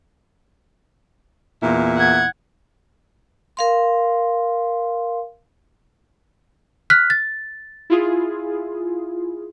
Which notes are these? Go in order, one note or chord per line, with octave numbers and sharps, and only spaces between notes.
E2 A#2 E4
F#5 G#6
A#4 F5 C6
F6 F#6 B6
A6
E4 F4 G#4